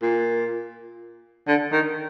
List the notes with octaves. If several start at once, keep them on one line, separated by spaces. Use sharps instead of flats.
A#2
D3
D#3